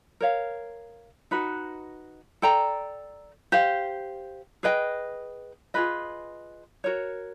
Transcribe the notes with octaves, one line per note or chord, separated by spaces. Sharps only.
A#4 C#5 F5
D#4 F#4 B4 D#5
A4 D5 G5 A#5
G4 C5 F5
G#4 B4 D#5 G5
F4 G#4 B4 D#5
F#4 A#4 C#5